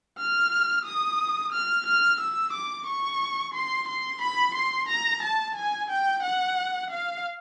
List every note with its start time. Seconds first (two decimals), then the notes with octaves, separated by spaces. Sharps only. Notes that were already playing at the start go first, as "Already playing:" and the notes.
0.19 F6
0.85 D#6
1.53 F6
1.86 F6
2.21 E6
2.53 D6
2.87 C#6
3.54 C6
3.89 C6
4.22 B5
4.55 C6
4.89 A#5
5.23 A5
5.56 G#5
5.91 G5
6.23 F#5
6.91 F5